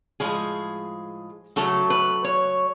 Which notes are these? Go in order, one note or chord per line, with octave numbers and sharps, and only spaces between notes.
A2 F3 G#3 G#4
C#3 F#3 A3 A4
B4
C#5